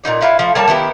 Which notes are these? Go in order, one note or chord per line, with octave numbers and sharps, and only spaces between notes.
A#2 G3 D#4 D5
E4 F4 E5 F#5
F3 A3
G3 A#3 C#5 A5
D#3 B3 E4 G4